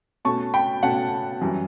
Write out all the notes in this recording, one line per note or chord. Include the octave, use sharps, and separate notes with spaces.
B2 A3 C#4 A5 C#6
G5 B5
B2 A3 C#4 F#5 A5
F#2 E3 G3